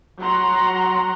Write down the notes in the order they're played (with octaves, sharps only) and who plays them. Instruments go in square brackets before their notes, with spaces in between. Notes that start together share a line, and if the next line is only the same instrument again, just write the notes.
[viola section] F#3 F#5 A#5 C6